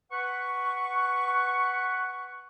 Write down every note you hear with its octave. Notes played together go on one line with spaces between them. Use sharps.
B4 F#5 C#6